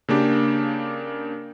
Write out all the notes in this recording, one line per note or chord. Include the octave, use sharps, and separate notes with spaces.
C#3 A#3 D4 G4